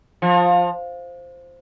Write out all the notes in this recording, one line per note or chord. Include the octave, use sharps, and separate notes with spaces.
F3